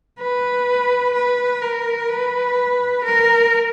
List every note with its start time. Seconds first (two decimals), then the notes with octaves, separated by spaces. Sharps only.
0.19 B4
1.14 B4
1.62 A#4
2.09 B4
3.05 A#4